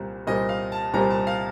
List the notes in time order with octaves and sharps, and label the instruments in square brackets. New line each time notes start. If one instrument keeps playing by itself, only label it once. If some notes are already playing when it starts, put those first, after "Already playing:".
Already playing: [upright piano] C2 A#2 G3 C4
[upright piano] C2 A#2 G3 C4 [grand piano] D#5
[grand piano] F5
A5
[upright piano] C2 A#2 G3 C4 [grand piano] A#5
[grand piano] A5
F5